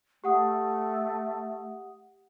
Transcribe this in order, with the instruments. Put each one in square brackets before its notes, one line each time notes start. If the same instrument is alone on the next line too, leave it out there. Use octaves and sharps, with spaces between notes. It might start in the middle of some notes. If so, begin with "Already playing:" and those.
[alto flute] A3 [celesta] G4 F#5 D#6